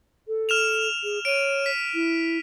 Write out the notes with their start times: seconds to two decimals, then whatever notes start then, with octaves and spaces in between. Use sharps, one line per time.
0.28 A4
0.49 F6 E7 F7
1.03 G#4
1.25 C#5 D7 D#7
1.66 B6
1.94 E4